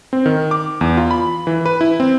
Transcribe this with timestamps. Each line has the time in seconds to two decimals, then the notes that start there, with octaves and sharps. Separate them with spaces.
0.13 C4
0.26 D#3
0.51 D6
0.81 E2
0.97 F4
1.11 B5
1.47 E3
1.66 B4
1.81 E4
2.00 C4